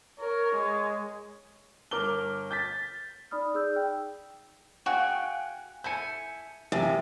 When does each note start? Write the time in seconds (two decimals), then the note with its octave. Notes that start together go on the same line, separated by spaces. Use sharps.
0.20 A#4 C#5
0.56 G#3
1.91 G1 A#4 D6 F6 G7
2.51 G6 A6 B6
3.31 D#4 D5 B5 D#6 F6
3.54 D#4 G#4 D5 E6 G6
3.76 G5
4.86 F#4 G#4 F5 G5 F#6
5.84 E4 A4 G#5 G6 C#7
6.72 A1 F#2 C3 F5